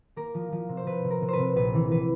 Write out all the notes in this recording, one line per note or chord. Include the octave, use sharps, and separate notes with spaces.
A#3 A#4
F3
F3
C3
C5
C3 B4
C3
A#4
C3
B4 C5
C3
A#1 B4
E3
E3 B4